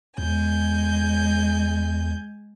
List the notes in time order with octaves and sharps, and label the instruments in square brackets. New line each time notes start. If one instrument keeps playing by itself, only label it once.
[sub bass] E2 [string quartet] G#3 G#5 G6